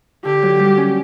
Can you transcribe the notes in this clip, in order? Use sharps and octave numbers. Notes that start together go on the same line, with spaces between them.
D3 G4
F#3
G3
C#4